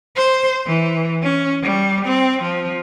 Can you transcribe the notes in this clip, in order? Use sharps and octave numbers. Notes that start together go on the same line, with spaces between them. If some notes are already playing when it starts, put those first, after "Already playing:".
C5
E3
C#4
G3
C4
F3